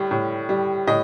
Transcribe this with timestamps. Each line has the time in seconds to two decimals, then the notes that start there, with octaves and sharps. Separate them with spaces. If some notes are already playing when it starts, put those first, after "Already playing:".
Already playing: A2 G3
0.11 A2
0.49 G3
0.87 A2 D#5